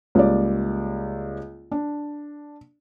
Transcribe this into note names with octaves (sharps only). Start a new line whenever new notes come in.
C#2 G3 A#3 D5
D4